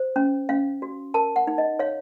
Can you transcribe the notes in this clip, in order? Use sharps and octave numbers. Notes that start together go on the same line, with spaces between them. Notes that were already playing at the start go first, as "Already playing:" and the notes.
Already playing: C5
C#4
C#4 F5
F#4
A#4 A5
F#5
D#4
D#5
C#5 F5